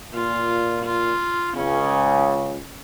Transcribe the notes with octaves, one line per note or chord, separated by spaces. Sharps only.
A#2 F4
F4
C#2 C#3 C#4